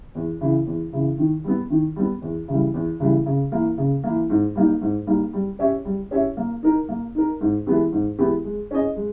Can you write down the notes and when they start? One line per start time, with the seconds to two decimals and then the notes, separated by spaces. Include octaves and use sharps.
0.15 E2
0.41 C#3 E3
0.66 E2
0.93 C#3 E3
1.18 D#3
1.44 G3 B3
1.70 D#3
1.96 G3 B3
2.22 E2
2.48 C#3 E3 G3
2.74 E2
3.00 C#3 E3 G3
3.26 C#3
3.52 E3 A#3
3.78 C#3
4.04 E3 A#3
4.30 G#2
4.55 G3 A#3 D#4
4.81 G#2
5.07 G3 A#3 D#4
5.33 G3
5.59 C#4 G4 C#5 E5
5.85 G3
6.11 C#4 G4 C#5 E5
6.37 A#3
6.63 D#4 A#4
6.89 A#3
7.15 D#4 A#4
7.41 G#2
7.66 E3 G#3 B3 G4
7.92 G#2
8.18 E3 G#3 B3 G4
8.44 G#3
8.71 C#4 G#4 D#5
8.96 G#3